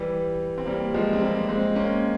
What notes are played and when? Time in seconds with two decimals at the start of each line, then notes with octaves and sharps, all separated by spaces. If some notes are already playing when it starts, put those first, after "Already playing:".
Already playing: E3 G3
0.58 C4
0.66 G3 A#3
0.94 F3 G#3
1.13 C4
1.21 G3 A#3
1.49 G#3 C4
1.75 A#3 C#4